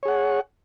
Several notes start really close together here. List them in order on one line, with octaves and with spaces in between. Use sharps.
C#5 G#4 F#5